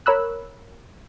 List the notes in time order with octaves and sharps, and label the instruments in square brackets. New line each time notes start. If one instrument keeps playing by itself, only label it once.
[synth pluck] A#4 C#5 B5 E6 F#6